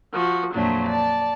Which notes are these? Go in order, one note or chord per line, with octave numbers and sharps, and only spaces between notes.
F3 F#4
F2 A#2 F#3 A3 D4
D5 A5